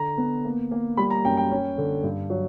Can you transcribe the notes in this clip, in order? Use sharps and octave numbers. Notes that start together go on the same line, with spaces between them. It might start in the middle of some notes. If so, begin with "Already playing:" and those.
Already playing: D3 A#5
B3
A#3
A#3
G3 B5
A#5
F#2 G5
G5
C#4
D3
G2
F#3